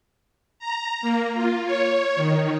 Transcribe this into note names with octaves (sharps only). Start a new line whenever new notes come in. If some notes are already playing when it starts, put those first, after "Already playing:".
A#5
A#3
F4
C#5
D#3